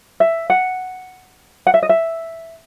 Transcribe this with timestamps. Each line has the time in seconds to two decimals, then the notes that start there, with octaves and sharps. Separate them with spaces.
0.20 E5
0.50 F#5
1.67 F#5
1.74 E5
1.83 D#5
1.89 E5